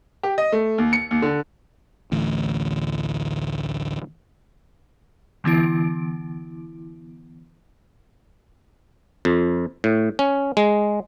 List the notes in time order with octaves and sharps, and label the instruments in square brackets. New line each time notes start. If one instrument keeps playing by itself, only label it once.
[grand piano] G4
D#5
A3
D#2
C#7
D#2
D3
[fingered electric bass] A1 D2
[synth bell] D3 E3 B3 E4 D7
[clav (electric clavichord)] F2
A2
C#4
G#3